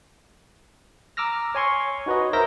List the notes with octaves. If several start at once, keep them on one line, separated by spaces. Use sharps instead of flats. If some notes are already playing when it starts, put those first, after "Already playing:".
A#5 D6 E6 F6 A#6
C#5 G#5 C6 C#6
D#4 F#4 B4 C#5 D#5
A#4 C5 E5 E6 G6 A#6